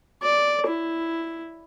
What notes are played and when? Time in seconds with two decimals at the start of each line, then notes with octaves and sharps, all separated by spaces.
0.23 D5
0.67 E4